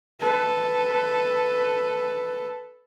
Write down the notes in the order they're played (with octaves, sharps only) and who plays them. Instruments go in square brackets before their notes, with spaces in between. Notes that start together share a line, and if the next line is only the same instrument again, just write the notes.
[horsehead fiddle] A4 B4